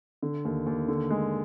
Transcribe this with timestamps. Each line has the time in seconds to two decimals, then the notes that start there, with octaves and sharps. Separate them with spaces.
0.22 D3
0.45 D#2
0.66 D#2
0.88 D3
1.10 G#3